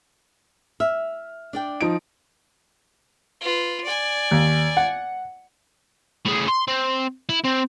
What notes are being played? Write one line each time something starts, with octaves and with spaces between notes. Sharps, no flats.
E5 F6
D4 D5 G5
F3 D#4 D7
F4 B4
D5 G#5
D#2
F#5
A2 G#4
C6
C4
E4
C4